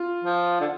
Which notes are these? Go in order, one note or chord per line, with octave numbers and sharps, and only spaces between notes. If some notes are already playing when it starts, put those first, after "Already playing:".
Already playing: F4
F3
D3